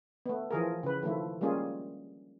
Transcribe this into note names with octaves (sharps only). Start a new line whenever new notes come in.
A3 B3
E3 F3 G#4 A#4
C#3 B4
D#3 F3 A3 E4
G3 G#3 A#3 C#4 F4 G#4